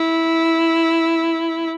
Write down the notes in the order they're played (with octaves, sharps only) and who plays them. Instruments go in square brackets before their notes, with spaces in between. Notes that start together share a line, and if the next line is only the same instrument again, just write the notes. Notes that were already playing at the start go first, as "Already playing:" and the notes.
Already playing: [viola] E4